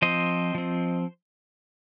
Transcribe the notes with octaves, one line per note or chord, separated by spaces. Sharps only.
F3 C4 C5 D#5
F3 C4